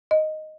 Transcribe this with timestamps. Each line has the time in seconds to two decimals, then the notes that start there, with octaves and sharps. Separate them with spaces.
0.11 D#5